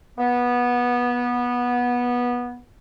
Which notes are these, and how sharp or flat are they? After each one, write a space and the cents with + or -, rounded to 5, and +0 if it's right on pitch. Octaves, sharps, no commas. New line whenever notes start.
B3 -15